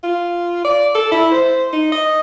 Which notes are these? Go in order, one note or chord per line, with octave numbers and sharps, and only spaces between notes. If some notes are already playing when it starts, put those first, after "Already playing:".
F4
D5
A4
E4
C5
D#4
D#5